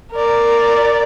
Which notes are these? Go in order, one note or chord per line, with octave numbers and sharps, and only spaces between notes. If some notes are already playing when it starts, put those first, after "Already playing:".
A#4 D5